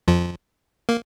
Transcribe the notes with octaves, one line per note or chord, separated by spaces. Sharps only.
F2 F3
A#3